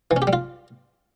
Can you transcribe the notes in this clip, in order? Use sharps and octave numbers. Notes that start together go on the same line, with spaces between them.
E3
C#4
G4
G3
F4